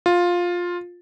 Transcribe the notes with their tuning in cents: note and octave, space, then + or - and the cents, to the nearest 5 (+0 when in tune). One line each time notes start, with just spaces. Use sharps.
F4 +10